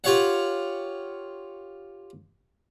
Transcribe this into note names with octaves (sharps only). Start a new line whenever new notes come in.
F4 G4 C#5 F5 F#5